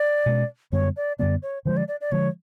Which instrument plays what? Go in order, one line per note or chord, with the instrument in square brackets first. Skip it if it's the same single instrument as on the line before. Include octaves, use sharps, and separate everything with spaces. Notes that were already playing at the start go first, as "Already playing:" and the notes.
Already playing: [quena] D5
[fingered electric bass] B2 G#3 C#4
[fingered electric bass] F#2 D3 G3 B3 [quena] C#5
[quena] D5
[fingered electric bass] F#2 D3 G3 B3 [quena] D5
[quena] C#5
[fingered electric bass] D3 F3 G#3 [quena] C5
[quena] D5
D5
D5
[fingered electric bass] D3 F3 G#3 [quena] C#5